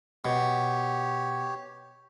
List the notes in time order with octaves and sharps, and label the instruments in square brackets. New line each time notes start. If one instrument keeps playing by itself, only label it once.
[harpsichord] B2 [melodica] G4 C#5